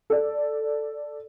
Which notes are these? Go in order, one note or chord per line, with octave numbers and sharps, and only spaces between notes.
A4 D5